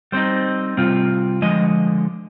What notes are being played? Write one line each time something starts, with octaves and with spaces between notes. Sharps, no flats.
G3 C4 D#4 C5
C3 G3 C4 F4
D3 F3 G#3 D#5